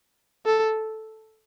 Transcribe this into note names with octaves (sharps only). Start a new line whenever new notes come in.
A4